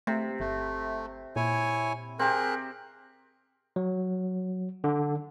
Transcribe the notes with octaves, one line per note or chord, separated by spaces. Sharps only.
C3 A3
G1 A3
A#2 E4 C#5 G#5
C4 G4 G#4 A#4 F#6
F#3
D3